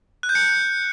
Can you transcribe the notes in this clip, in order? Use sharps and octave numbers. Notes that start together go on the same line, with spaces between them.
F#6
G6
C#7